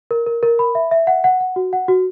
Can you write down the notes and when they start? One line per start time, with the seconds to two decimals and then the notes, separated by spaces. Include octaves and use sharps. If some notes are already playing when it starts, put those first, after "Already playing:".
0.11 A#4
0.27 A#4
0.43 A#4
0.59 B5
0.75 E5
0.91 E5
1.07 F#5
1.24 F#5
1.40 F#5
1.56 F#4
1.73 F#5
1.88 F#4